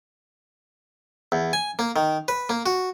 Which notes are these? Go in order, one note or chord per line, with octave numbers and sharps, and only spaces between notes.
E2
G#5
A#3
D#3
B4
A#3
F#4